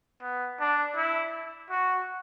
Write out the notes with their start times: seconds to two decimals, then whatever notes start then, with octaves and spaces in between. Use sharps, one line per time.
0.22 B3
0.60 D4
0.96 E4
1.70 F#4